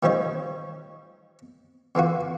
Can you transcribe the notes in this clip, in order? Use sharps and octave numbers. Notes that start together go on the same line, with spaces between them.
D#3 F3 G3 C#5 D#5
D3 E3 F4 F#4